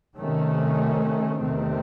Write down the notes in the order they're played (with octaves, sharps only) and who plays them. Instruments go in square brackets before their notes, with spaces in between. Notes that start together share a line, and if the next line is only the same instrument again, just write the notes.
[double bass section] C3 D#3 A3 C#4
E2 C3 D#3 A3 C4